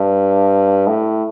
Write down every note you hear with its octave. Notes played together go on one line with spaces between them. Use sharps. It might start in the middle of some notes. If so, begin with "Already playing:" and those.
Already playing: G2
A2